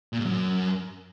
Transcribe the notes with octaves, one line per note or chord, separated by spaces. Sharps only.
A#2
G#2
F#2